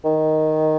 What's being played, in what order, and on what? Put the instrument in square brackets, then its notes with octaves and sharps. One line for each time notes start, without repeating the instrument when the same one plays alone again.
[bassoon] D#3